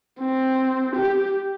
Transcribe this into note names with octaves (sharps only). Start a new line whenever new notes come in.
C4
G4